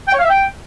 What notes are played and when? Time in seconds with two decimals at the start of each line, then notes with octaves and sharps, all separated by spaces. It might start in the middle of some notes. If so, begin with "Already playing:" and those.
0.08 G5
0.13 C#5
0.18 F5
0.23 E5
0.29 G5